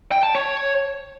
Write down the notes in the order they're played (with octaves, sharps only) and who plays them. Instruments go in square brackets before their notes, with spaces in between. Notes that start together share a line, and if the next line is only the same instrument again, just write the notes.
[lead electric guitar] G5
A5
C#5